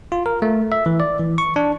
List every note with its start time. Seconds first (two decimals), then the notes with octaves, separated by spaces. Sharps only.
0.12 F4
0.26 A#4
0.42 A3
0.72 E5
0.86 E3
1.00 D5
1.19 E3
1.38 C#6
1.56 D4